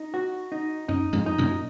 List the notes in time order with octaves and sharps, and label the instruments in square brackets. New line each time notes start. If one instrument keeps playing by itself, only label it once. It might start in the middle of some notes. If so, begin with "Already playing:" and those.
Already playing: [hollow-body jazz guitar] D#4
F#4
D#4
[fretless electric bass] F#2 [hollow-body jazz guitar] D#4
[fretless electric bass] F2 G#2
[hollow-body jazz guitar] D#4
[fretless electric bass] F#2 A#2